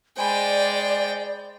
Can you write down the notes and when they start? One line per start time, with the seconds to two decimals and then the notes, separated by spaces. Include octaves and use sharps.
0.17 G#3 C5 D5 G5 G#5 B5